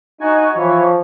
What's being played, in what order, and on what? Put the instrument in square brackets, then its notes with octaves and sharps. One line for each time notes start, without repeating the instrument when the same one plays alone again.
[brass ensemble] D#4 [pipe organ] F#4 G#5
[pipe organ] E3 C#5 [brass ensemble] F3